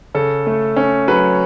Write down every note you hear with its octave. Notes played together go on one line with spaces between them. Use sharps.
C#3 A4
A3
C#4
F#3 B4